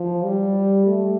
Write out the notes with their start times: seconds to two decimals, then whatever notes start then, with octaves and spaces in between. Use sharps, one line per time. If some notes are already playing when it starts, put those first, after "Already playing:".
Already playing: F3
0.24 G3
0.86 A3